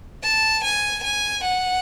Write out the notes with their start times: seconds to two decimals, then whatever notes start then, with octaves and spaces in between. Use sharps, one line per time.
0.23 A5
0.64 G#5
1.04 G#5
1.44 F#5